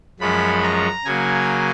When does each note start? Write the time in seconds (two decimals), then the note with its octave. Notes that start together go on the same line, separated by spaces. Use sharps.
0.20 F#2 F3 G#3 C#4 B5
0.63 A#5
1.05 C#3 F#3 A#3 G#5